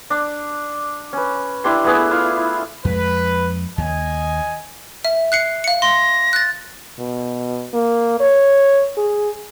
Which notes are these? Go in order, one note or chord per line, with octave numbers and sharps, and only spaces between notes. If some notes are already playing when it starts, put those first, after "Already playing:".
D4
C#4 B4
D4 E4 G4 C6
A3 B3 G#4 B4
E4 F4 F5
F2 G#3 B4
D#2 D#5 G#5
E5
F#6 C7 C#7
F5 C#7
C6 A#6
F#6 A6
B2
A#3
C#5
G#4